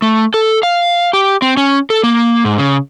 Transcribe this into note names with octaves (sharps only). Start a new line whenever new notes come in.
A3
A4
F5
G4
C4
C#4
A4
A#3
G#2
C#3